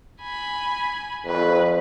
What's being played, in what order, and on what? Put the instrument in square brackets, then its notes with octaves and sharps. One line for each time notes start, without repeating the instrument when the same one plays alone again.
[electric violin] G#5 B5
[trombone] F2 [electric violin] B4